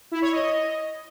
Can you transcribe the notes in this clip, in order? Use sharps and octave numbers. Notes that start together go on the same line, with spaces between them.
E4
C#5
D#5